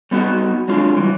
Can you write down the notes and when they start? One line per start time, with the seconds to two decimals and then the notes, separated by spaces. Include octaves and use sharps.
0.11 G3 B3 D#4 F#4
0.68 F#3 G#3 D4 F4
0.96 C#3 E3 G3